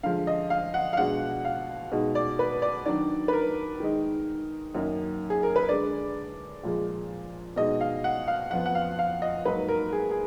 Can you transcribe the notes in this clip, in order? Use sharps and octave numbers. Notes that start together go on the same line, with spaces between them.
D3 F3 G#3 F5
D#5
F5
F#5
F5
B2 G#3 D4 F#5
F5
B2 G#3 D#4
D5
B4
D5
D#3 F#3 D4 D5
B4
A#4
D#3 G#3 D#4
F#2 D#3 A#3 D#4
G#4
A#4
B4
D3 G#3 D4 D5
A#2 F3 G#3
B2 G#3 D#4 D#5
F5
F#5
F5
F2 F3 B3 F#5
F#5
F5
F5
D#5
G#2 F#3 A#3 D#4 B4
A#4
G#4
G#4